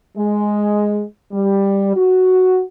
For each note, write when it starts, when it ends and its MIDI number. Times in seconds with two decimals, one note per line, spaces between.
0.17 1.02 56
1.32 1.94 55
1.96 2.61 66